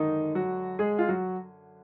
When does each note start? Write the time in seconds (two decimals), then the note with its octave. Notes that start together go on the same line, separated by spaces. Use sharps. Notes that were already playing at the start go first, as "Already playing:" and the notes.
Already playing: F#2 D3 D#3 G#3 D#4
0.35 F#3 F#4
0.79 G#3 G#4
0.99 F4
1.09 F#3 F#4